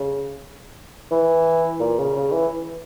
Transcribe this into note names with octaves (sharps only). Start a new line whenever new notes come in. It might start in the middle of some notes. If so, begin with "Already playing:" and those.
Already playing: C#3
E3
A#2
C#3
C#3
E3